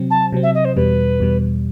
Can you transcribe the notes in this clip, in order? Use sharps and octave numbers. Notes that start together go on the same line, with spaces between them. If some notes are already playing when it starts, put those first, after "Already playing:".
Already playing: C3 F#3 C4
A5
C3 F#3 C4
E5
D#5
C5
E2 B2 G3 B4
E2 B2 G3